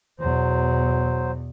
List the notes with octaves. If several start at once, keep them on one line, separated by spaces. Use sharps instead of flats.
E2 B2 F#3 C5